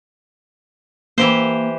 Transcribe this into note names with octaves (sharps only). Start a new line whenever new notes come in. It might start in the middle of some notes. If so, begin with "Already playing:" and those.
E3 A#3 G4 C5